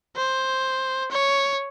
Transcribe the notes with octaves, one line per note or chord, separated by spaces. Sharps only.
C5
C#5